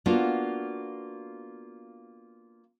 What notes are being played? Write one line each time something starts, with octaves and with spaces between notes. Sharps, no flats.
A#3 B3 D4 F4 F#4